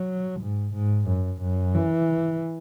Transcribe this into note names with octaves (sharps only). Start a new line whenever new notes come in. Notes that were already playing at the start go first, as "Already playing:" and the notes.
Already playing: F#3
G#2
G#2
F#2
F#2
E3